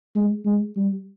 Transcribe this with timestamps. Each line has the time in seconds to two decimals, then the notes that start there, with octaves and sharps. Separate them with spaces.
0.15 G#3
0.45 G#3
0.76 G3